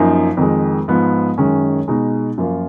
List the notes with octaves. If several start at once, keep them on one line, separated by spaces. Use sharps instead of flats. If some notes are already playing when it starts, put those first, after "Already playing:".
Already playing: F#2 F3 A#3 D#4
F2 D#3 G#3
G#2 F3 B3
F#2 D#3 G#3 C#4
B2 G#3 D#4
F#2 F3 A#3 F4